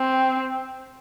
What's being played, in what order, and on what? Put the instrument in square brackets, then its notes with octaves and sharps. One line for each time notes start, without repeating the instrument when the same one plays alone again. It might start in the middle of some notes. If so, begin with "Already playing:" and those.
Already playing: [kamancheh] C4